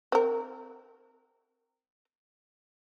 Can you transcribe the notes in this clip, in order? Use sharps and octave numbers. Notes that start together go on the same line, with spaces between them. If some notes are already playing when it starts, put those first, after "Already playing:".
C4 A#4